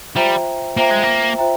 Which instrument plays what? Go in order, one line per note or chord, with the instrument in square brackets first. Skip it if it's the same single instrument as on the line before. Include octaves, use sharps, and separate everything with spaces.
[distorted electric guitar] G3 [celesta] F4 C5 E5 G5 A#5
[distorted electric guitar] A#3 [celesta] F4 C5 E5 G5 A#5
[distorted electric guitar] G#3
A#3
[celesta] F4 C5 E5 G5 A#5